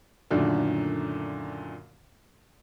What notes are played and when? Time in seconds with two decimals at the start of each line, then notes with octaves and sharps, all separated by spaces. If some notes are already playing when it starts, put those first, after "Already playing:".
0.30 F#2 A#2 D3 D#3 A3 D4